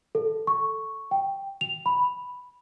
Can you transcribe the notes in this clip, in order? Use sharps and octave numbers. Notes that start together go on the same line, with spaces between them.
A4
C#6
G5
F7
B5